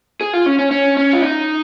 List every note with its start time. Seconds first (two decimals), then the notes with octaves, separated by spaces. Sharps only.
0.21 G#4
0.33 F4
0.46 C#4
0.59 C#4
0.71 C#4
0.97 C#4
1.13 F4
1.22 D#4